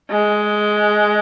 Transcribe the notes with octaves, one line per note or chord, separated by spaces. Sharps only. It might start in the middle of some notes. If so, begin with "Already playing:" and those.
G#3